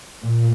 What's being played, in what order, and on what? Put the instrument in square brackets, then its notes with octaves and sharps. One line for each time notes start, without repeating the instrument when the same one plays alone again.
[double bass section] A#2